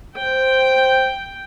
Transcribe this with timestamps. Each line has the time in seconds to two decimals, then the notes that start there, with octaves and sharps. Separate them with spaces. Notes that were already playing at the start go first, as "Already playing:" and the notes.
0.18 C5 G5